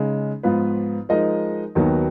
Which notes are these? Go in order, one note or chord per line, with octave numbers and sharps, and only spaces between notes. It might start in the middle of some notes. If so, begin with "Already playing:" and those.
Already playing: C#3 G#3 D#4
G#2 F3 B3 F4 B4
F3 G#3 D#4 A#4 D#5
D#2 D#3 F#3 B3 F#4